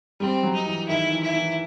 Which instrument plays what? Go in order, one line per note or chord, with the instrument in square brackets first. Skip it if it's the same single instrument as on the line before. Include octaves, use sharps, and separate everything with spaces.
[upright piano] G3 [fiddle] C4
[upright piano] F#3
[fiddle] D#4
[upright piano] E3
[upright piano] D#3 [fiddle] E4
[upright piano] E3
[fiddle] E4
[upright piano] E3